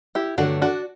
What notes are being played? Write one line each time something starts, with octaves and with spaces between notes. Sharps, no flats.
E4 G4
G2 D3 F#3 A3 D4 F#4
D4 F#4